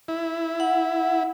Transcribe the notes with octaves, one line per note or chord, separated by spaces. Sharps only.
E4
F#5